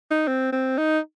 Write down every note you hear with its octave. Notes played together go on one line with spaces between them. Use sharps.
D#4
C4
C4
D#4